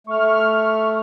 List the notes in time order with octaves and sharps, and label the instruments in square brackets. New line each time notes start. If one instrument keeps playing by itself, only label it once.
[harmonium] A3 [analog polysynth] C#6 F6